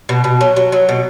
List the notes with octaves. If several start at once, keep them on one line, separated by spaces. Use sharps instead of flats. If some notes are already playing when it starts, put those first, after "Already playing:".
B2
B2
F#3
F#3
F#3
B2